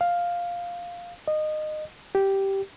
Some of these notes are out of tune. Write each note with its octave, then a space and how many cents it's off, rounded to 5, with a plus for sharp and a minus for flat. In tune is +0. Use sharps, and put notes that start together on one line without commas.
F5 +5
D#5 -20
G4 -10